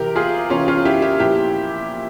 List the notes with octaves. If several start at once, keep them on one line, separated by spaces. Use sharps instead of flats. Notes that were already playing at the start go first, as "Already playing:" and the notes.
Already playing: C3 E3 G4 A#4
F4 G#4
C3 E3 C#4 F4
C#4 F4
E4 G4
E4 G4
A#2 F3 E4 G4